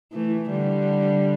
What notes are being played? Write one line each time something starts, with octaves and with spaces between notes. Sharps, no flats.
E3 A3
D3 G3